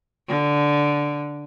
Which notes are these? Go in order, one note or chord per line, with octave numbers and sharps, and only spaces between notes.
D3